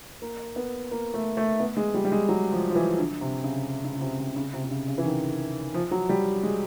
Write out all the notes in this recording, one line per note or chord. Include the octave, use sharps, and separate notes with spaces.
A#3
B3
A#3
A3
A3
B3
G#3
G3
G3
G#3
F#3
F3
F3
E3
D3
C3
C#3
C#3
C#3
C3
C3
C#3
C3
C3
C#3
C#3
E3
D#3
F3
F#3
G3
G#3